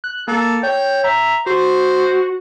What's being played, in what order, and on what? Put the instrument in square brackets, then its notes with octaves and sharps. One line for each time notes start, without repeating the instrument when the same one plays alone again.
[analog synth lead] F#6
[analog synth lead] A#3 [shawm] A4
[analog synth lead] C#5 [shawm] G5
[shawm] E5 [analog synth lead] A#5
[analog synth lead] F#4 [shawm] C5